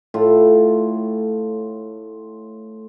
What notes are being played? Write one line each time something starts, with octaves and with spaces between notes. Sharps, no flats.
A2 F4